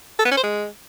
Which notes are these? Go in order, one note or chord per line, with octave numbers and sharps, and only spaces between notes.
A4
B3
C#4
C5
G#3